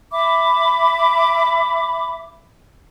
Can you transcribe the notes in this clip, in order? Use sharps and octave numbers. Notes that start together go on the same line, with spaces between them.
E5 B5 D6